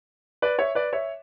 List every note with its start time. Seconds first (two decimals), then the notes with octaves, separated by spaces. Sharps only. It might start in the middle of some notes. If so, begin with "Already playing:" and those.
0.42 B4 D5
0.59 C#5 E5
0.75 B4 D5
0.93 C#5 E5